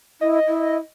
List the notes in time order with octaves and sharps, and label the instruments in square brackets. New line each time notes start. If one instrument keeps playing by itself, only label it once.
[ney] E4 [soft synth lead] D#5
[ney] E4